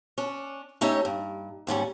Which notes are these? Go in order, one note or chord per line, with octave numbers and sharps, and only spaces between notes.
C#4 D4
A3 C#4 D#4 G4 C#5 E5
G2
D#2 G#2 G3 C#4